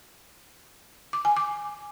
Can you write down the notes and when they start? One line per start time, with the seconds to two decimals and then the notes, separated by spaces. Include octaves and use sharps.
1.13 D6
1.25 G#5
1.37 D6